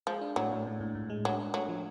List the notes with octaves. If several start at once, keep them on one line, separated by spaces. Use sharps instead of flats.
F3 G#3
D4
A2 F#3
A2
A2
A2
A2
G#3
F#3 D4
D4
F#3 A3
F3